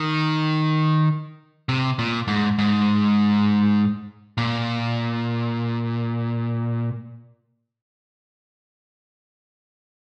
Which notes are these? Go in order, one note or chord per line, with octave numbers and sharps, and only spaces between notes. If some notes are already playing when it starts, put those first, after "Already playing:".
Already playing: D#3
C3
A#2
G#2
G#2
A#2